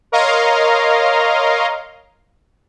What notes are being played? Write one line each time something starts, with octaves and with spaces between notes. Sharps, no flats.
A#4 C#5 D#5 F5 A#5 C6